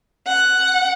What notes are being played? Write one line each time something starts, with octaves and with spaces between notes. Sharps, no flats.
F#5